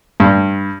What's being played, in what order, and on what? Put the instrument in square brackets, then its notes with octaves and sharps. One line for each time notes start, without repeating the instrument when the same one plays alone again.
[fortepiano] G2